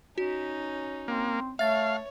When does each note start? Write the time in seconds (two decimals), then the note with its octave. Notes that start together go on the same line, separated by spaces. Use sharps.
0.18 C#4 D#4 F#4
1.08 A#3 C4
1.59 A3 C#5 E5 F5 A6